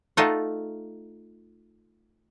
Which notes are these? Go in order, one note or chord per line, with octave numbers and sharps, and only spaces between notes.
A3 D#4 F4 A4 F#5